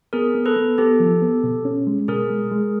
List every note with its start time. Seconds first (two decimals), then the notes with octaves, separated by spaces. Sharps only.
0.13 B3 G#4 A#4
0.35 B3
0.46 A4 B4
0.57 B3
0.78 B3 G4 A4
1.00 F3
1.22 B3
1.44 B2
1.65 C#4
1.87 G#3
2.08 B2 G#4 A#4
2.30 G#3
2.52 G#3